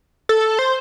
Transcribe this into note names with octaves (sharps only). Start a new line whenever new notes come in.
A4
C5